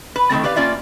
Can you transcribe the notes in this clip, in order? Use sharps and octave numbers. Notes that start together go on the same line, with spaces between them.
B4
D#3 F#3 A3 C4
G4 B4 D5 F5
A#3 C#4 F4 D5 E5